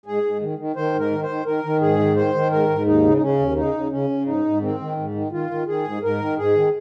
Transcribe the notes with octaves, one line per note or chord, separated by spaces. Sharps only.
G#2 G#4
G#2
D#3
D#3
D#3 C5
G#2
A#4
D#3
C5
D#3
D#3 A#4
D#3
G#2 G#4
D#3
D#3 C5
D#3
G#2 A#4
G#2
D#2 D#4
C#3
D#4
C#3 C#4
D#2
C#3 D#4
C#3
C#3 C#4
C#3
G#2 D#4
G#2
D#3 C4
D#3
G#2
D#3
D#3 F4
D#3
D#3 G#4
G#2
G#2 A#4
D#3
G#2 G#4
D#3